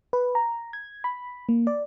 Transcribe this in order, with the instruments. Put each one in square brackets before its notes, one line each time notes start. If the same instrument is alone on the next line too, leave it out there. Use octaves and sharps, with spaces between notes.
[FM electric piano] B4
A#5
G#6
B5
A#3
D5